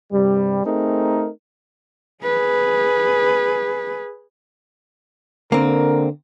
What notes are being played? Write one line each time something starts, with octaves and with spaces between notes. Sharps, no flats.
G2 C3 G3
A3 C4 D#4 G#4 A#4
G#4 B4
D3 A#3 C4 A#4